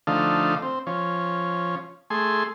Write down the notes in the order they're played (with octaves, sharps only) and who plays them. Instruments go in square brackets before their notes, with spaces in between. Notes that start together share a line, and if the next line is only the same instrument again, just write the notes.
[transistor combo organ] D3 F3 A3 D#4 F5
C4
F3 C#4
A3 G#4 C6